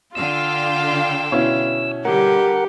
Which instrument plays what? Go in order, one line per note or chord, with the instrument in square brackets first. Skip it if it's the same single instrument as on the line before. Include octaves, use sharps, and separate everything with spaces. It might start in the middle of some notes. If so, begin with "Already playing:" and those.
[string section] D3 F5 G5 [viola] F4 [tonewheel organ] E6
[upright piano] B2 C#4 E4
[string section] D3 G3 [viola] G4 [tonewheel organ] A#4 F#5